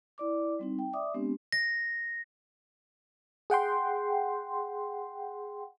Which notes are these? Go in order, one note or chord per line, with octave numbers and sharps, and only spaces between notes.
E4 D5 D6
G3 C4 D#4
G5
D5 E5 D6 D#6
G#3 B3 C4 D4 G4
A#6
G#4 F#5 G5 C6